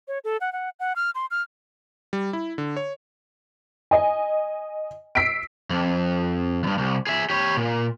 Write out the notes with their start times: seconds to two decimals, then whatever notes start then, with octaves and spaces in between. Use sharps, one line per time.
0.08 C#5
0.24 A4
0.41 F#5
0.53 F#5
0.80 F#5
0.96 F6
1.15 C6
1.31 F6
2.13 G3
2.33 E4
2.58 D3
2.76 C#5
3.91 D#5 G#5
5.15 E6 B6 C7 D7
5.70 F2
6.63 E2 G2
6.78 C2
7.07 G#4 E5
7.30 G4 C#5
7.57 A#2